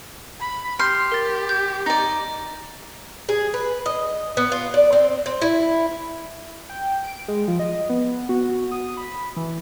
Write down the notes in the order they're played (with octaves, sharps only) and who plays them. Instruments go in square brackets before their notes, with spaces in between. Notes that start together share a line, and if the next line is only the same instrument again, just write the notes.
[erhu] B5
[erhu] G4 [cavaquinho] C6 [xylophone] F6 G6
[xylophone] A#4 A6
G6
[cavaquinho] D#4 D5
[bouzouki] G#4
B4
D#5
B3
F4
D5
C4
C4
E4
[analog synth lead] G5
D7
G#3
F3
D#5
B3
F#4
D#6
B5
E3